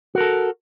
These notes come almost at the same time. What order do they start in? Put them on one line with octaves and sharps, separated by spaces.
F#4 A#4 A4